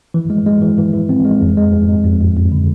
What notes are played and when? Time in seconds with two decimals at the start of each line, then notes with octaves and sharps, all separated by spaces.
0.14 E3
0.30 G#3
0.46 G#3
0.62 E3
0.78 E3
0.93 E3
1.09 C4
1.25 G#3
1.41 F2
1.57 G#3
1.73 F2
1.89 G#3
2.04 F2
2.20 F2
2.37 F2
2.52 D3